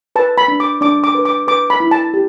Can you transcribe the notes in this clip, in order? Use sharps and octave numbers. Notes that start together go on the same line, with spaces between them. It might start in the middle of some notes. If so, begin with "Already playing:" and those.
B4 A5
B5
D4
D6
D4 D6
D6
B4
D6
B4 D6
B5
E4
A5
G4